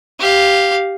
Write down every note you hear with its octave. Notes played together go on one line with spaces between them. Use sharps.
G4 F5